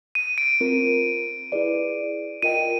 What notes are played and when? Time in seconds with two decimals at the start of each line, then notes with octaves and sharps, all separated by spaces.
0.15 D#7
0.38 D7
0.61 C4 F4 A#4
1.52 E4 G#4 B4 D5
2.42 F4 A#4 D#5 G5 D#7